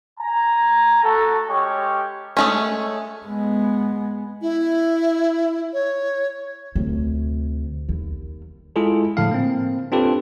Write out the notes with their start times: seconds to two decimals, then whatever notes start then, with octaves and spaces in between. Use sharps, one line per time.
0.20 G#5 A#5
1.03 A3 F#4 A4
1.49 G#3 C#4 G4 C#5 C#6
2.37 G#3 A3 C#4
3.26 G#3 B3
4.41 E4
5.73 C#5
6.75 D2 C3
7.89 D#2
8.76 G#3 E4 F4 G#4 A4
9.17 A2 D3 F3 F5
9.31 A#3 C4
9.92 C4 D4 F4 G4 A4 B4